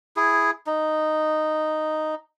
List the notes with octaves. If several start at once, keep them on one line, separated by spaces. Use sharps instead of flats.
E4 G#4
D#4